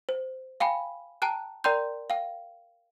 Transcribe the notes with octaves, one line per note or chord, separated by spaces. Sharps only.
C5
F5 G5 G#5 B5
G5 A5 A#5 F#6
A#4 D5 G5 A#5 C6 G6
F5 G5